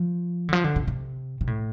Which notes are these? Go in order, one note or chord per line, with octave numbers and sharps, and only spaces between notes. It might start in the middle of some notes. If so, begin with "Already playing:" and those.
Already playing: F3
D3
F3
D3
C3
C3
C3
A2